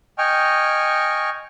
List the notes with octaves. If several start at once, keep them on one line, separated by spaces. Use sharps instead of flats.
D#5 G5 G#5 C#6 F6